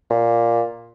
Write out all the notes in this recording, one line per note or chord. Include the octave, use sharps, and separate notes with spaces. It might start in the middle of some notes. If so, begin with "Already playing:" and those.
A#2